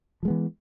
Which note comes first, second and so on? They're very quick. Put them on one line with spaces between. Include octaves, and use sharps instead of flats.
F3 G#3 B3 E3